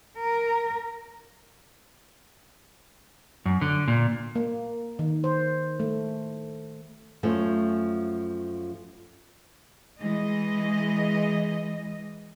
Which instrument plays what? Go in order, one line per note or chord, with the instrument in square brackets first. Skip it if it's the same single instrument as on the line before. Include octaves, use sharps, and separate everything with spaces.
[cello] A#4
[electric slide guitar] F#2
D3
A#2
[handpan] A#3
D#3
C5
A3
[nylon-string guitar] F#2 F3 A3
[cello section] E3 G#3 D#5